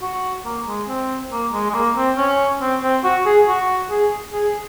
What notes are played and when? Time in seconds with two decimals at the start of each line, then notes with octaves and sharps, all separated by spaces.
0.02 F#4
0.45 A#3
0.67 G#3
0.88 C4
1.32 A#3
1.53 G#3
1.70 G#3
1.75 A#3
1.97 C4
2.17 C#4
2.61 C4
2.83 C4
3.04 F#4
3.26 G#4
3.48 F#4
3.91 G#4
4.33 G#4